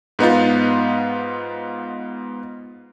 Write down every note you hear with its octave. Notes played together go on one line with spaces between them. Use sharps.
G#2 B3 D#4 F4